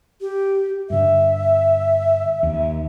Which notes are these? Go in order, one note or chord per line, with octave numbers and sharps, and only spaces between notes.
G4
G2 D3 E5
D#2